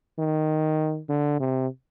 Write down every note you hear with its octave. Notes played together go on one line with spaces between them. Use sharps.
D#3
D3
C3